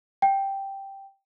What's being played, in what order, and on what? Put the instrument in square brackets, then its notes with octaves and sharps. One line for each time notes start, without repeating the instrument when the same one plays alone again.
[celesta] G5